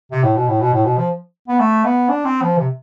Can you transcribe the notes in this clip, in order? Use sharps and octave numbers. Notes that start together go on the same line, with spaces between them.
C3
A2
B2
A2
B2
A2
B2
F3
B3
A3
B3
D4
C4
F3
C3